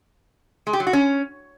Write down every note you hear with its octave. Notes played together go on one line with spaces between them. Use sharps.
G#3
G4
F#3
F#4
C#4